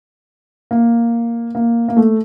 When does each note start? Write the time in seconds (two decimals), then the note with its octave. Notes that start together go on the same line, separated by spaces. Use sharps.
0.71 A#3
1.55 A#3
1.88 A#3
1.97 A3